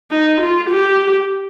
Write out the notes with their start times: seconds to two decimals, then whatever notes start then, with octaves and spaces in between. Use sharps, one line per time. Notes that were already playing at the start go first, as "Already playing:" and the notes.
0.11 D#4
0.41 F4
0.70 G4